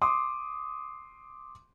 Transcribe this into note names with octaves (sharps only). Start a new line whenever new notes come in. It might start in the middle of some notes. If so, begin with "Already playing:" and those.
C6 D6 D#6